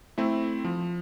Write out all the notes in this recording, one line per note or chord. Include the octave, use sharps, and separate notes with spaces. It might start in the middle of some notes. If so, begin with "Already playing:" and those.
A3 C4 E4
F3